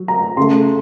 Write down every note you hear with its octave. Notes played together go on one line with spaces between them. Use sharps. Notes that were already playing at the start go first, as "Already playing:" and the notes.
Already playing: F#3
A#5
C#3 A3 C6